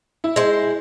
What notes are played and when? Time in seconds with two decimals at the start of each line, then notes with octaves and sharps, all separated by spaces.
0.24 E4
0.36 G#3 C5